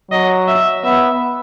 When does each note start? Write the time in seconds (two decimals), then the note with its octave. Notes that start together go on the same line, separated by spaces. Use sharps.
0.11 F#3 D#5
0.48 E5
0.84 B3 E5